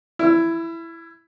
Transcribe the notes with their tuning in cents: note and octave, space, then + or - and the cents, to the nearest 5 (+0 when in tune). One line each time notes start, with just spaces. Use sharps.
E4 +10 E6 +40